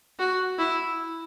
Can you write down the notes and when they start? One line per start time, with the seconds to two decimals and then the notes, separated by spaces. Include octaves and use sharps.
0.19 F#4
0.59 E4